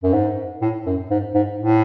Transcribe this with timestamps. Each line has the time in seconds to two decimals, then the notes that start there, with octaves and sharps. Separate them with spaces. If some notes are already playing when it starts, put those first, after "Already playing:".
0.04 F#2
0.13 G#2
0.62 A2
0.86 F#2
1.10 G#2
1.34 G#2
1.59 A2